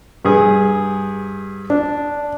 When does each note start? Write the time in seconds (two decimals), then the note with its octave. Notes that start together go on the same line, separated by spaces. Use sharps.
0.25 G2 G#4
1.70 D4